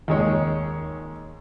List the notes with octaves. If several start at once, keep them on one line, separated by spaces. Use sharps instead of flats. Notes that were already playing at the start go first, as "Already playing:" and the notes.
D#2 G#3 C#5